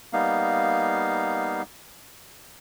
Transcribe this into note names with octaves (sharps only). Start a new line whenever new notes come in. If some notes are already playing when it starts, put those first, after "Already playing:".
G3 A#3 B3 D#4 F5